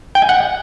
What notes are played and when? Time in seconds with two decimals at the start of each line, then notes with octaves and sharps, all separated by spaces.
0.15 G5
0.22 G#5
0.29 F#5